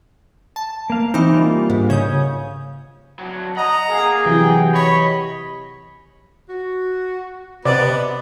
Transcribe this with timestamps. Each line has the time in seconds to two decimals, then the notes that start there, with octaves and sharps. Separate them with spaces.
0.56 A5
0.90 A#3 F5
1.14 E3 C4 D#4
1.34 G3 A#3 F4
1.70 A#1 G#2
1.90 C#3 C#5 D#6 G6
3.19 F#3 D4
3.57 D#5 F#5 A#5
3.90 G#4 A#4 F5
4.25 C3 E3 F#3 G4 G5
4.74 C#5 D#5 B5
6.49 F#4
7.65 C3 B3 B4 C5 D5 D#5